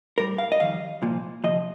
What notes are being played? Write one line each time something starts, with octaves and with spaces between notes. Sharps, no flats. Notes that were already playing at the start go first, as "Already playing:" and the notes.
A2 G3 A#4
F5
D#5
F2 D#3 G3 F5
C2 A#2 F3
D2 C3 F3 D#5